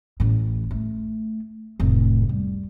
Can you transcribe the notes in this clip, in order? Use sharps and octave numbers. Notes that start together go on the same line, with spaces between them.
A1 A2
A3
F1 A2
G3